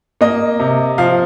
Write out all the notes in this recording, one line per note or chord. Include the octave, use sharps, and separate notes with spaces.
A#3 D#5
C3
F3 F5